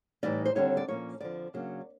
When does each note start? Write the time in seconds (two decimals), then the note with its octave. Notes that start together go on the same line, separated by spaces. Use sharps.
0.23 A2 E3 G3 A#3 D#4 D5
0.45 C5
0.55 D#2 D3 G3 C4 C#5
0.77 D5
0.88 A#2 F3 A#3 C#4 C#5
1.20 F2 D3 F3 D5
1.54 C#3 F#3 A#3 D4